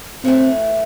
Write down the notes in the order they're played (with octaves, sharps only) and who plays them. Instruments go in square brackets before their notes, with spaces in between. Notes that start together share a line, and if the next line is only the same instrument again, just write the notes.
[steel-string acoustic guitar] A2 E3 A3 [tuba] C4